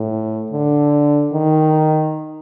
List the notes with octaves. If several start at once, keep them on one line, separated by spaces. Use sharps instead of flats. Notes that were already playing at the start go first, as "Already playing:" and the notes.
Already playing: A2
D3
D#3